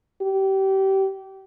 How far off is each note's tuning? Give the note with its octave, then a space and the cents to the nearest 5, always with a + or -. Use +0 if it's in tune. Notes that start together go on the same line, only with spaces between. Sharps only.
G4 -25